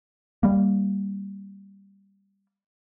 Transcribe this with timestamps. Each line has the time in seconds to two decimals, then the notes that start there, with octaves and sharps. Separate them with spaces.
0.43 G3 A#3